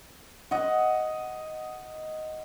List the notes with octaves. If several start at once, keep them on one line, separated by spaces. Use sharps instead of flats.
D#5 F#5